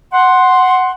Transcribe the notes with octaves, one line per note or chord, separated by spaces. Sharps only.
F#5 C6